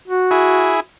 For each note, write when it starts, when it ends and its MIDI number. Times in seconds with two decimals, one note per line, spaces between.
0.07 0.79 66
0.31 0.80 64
0.31 0.80 68